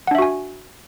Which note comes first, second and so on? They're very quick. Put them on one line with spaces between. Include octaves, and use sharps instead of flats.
F#5 D4 E5 F#4 G#5